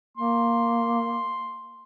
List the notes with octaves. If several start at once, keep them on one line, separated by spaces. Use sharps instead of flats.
A#3 C6